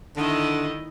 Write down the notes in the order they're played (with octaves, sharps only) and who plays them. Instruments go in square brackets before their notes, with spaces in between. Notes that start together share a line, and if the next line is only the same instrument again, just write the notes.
[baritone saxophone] D3 [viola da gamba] D#3 E4 D#5